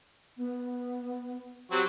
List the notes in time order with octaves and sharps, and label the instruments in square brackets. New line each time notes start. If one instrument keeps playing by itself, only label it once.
[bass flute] B3
[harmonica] F#3 C4 F#4 [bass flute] G4